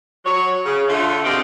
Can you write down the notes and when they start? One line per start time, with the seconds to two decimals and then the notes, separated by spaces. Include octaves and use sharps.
0.25 F#3 C#5
0.65 C#3
0.88 D3 A3 F4
1.24 B2 C4 F4 G4 D5 D#5